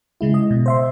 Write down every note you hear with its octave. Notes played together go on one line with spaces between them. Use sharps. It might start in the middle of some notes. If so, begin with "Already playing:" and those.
C#3 G#3 E4
D#5
B2
C5 E5 C6